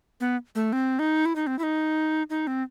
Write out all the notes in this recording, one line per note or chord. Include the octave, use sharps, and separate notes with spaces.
B3
A3
C4
D#4
E4
D#4
C4
E4
D#4
D#4
C4